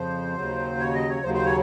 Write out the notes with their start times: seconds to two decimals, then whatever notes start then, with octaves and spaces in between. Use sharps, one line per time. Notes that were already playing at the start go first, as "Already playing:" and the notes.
Already playing: F2 C#3 F3 C5
0.35 D#2 C#3 F#3
0.79 C#5
0.94 D#5
1.09 C#5
1.23 D#2 C#3 F#3 C5
1.34 C5
1.45 C#5